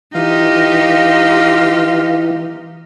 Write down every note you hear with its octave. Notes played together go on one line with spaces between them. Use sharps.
E3 D#4 F4 G4